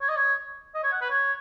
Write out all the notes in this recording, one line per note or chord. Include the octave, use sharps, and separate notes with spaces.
C#5
D#5
C#5
D#5
C#5
F#5
B4
C#5